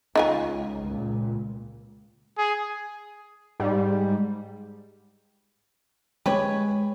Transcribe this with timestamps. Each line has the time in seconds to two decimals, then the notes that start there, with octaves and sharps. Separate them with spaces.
0.15 C#2 D#4 F4 G#5
0.85 C#2 A#2
2.38 G#4
3.60 G#2 G3
6.26 G#3 G4 B4 C#5